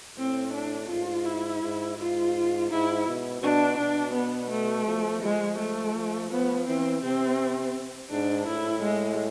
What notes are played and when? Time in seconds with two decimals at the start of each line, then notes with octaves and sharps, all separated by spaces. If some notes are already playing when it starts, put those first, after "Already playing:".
0.17 A2 C4
0.53 D4
0.89 G#2 F4
1.25 E4
1.62 G#2
1.97 G#2 F4
2.70 G#2 E4
3.07 B2
3.42 B2 D4
3.78 B2 D4
4.14 B3
4.51 A3
4.86 F3
5.22 F3 G#3
5.58 A3
5.94 F3
6.30 F3 B3
6.67 E3 C4
7.02 C3 C4
8.10 G#2 D4
8.46 A2 E4
8.83 G#3